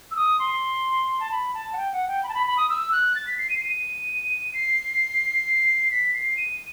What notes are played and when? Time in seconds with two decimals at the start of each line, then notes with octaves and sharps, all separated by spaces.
0.11 E6
0.16 D#6
0.39 C6
1.20 A5
1.31 B5
1.54 A5
1.73 F#5
1.77 G5
1.93 F#5
2.08 G5
2.23 B5
2.29 A5
2.34 B5
2.47 B5
2.57 D#6
2.69 E6
2.92 F#6
3.15 A6
3.27 B6
3.38 C7
3.50 D#7
3.57 C7
3.64 D#7
4.54 C7
5.91 B6
6.14 C7
6.37 D#7